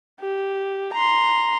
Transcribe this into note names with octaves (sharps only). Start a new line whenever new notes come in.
G4
A#5 C6